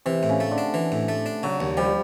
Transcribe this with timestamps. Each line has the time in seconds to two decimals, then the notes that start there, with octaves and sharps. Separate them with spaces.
0.06 C3 E3
0.23 A2
0.29 C#3
0.40 A3
0.51 D3
0.58 D4
0.74 E3
0.92 A2
1.09 A3
1.26 D4
1.43 C#3 F#3
1.60 D#2
1.77 F3 G3